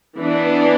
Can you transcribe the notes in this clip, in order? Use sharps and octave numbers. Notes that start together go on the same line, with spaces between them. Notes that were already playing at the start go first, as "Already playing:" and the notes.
E3 B3 D4